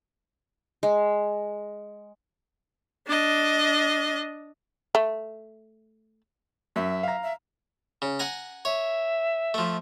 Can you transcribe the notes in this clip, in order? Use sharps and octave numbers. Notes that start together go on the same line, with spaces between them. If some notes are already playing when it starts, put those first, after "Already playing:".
G#3
D4 D#5
A3
F#2 E5
F5 A#5
E5
C#3
F#5 G#5 A#5
C#5 E5
F3 A3